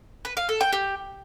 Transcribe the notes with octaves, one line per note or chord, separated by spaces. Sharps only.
B4
F5
A4
G5
G4